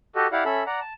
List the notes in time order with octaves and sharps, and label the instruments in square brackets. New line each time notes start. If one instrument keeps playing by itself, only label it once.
[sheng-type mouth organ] F#4 G4 A4 D#5
E4 G4 D5 F5 F#5
C#4 A4 E5 B5
D5 F#5 A#5
A5